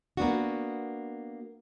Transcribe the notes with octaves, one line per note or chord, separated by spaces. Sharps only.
A#3 B3 D4 F#4